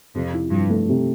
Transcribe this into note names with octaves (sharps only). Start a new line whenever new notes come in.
F2 C3
E4
G2 F3
A3
C3